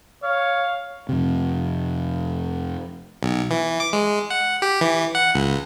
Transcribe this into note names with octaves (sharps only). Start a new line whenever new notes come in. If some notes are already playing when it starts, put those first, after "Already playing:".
C#5 F5
F2 C3
B1
E3
D6
G#3
F#5
G4
E3
F#5
C#2